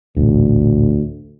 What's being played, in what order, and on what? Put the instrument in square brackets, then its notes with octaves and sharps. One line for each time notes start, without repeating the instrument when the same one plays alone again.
[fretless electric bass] D#1 A1 [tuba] D2